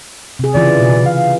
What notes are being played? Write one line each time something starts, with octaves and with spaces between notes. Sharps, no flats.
C3 G#4
C#3 E3 F4 D5
B2
F5